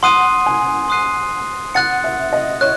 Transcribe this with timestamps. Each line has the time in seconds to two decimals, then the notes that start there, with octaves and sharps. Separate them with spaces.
0.03 F#5 C6 D#6 F#6 C7 D#7
0.46 G#5
0.89 C6 D#6 F#6 C7 D#7
1.74 F#5 F#6 A6 C#7
2.04 E5
2.33 D#5
2.61 C#5 F#6